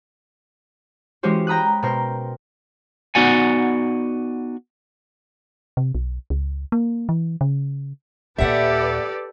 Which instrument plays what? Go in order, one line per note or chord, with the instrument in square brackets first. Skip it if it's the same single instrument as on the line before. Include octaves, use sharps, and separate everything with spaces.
[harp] E3 G#3 C#4 F#4 G4 C5
G5 A#5 B5 D#6 F#6
B2 A#4 C5 G5 G6
[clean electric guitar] B3 D#4 F#4 D5 F#5 G#5
[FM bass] C3
B1
C#2
A#3
E3
C#3
[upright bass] D#2 A#2 [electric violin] G4 A4 [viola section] B4 D5 [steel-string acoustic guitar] E5 F#5